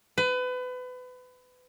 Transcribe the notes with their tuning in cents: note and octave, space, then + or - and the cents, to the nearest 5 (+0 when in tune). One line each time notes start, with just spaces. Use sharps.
B4 +30